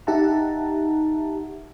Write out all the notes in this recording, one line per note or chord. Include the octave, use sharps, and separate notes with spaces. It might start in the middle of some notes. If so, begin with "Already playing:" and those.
D#4 G4 E5 F#5 A5 A#5